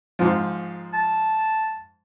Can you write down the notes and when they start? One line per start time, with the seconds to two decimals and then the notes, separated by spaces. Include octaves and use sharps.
0.19 G#2 F3
0.94 A5